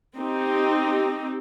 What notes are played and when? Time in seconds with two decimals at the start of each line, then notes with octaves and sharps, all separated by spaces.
0.16 C4 D#4 G4